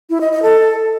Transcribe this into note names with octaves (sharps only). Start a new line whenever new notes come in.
E4
D#5
D#5
A4